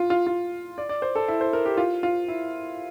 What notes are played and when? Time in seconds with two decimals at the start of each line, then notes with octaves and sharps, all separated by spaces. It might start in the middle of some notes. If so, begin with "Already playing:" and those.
Already playing: F4
0.10 F4
0.27 F4
0.78 D5
0.89 D5
1.02 C5
1.15 A4
1.28 E4
1.41 C5
1.53 A#4
1.65 G4
1.77 F4
2.03 F4
2.28 E4